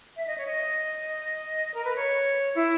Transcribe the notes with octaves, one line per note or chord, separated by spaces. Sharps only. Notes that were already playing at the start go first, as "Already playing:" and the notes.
E5
D#5
C#5
D#5
A#4
B4
C#5
E4